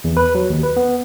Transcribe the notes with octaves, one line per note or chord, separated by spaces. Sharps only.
E2
B4
F#3
D#2
B4
B3